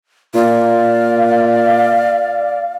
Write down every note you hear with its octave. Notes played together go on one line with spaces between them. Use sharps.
A#2 D5 F5